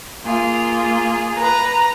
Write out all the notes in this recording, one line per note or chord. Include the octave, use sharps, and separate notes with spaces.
A#3 F4 G#4
B4 A#5